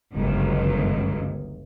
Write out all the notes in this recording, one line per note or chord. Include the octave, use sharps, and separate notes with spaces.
G1 C#2 F#2 D#3